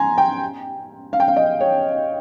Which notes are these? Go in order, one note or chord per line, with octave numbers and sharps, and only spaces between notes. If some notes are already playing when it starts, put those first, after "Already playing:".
Already playing: G#5 A#5 C6
G5
F5
G5
F5
D#5
C#5